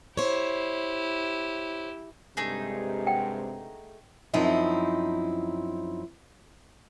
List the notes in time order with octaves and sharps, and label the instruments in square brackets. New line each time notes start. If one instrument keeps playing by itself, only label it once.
[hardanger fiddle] E4 G4 [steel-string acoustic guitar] C5 C#5
[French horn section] G2 C3 G#3 [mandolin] A3 D#4 G#4
[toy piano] F#5 G5
[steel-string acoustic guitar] F#2 F3 C4 D#4 E4